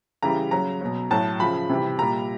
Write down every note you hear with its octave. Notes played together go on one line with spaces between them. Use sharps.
C#3 E3 G3 A#5
C#3 F#3 A#5
B2 F#3
A2 F#3 A5
C#3 F3 B5
C3 E3 G3
A#2 G3 A#5